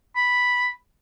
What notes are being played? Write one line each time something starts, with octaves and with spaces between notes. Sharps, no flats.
B5